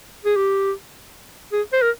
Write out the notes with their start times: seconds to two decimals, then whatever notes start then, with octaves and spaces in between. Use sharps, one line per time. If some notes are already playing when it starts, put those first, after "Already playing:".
0.25 G#4
0.36 G4
1.53 G#4
1.73 C5
1.82 A#4